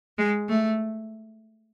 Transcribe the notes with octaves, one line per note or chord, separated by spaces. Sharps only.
G#3
A3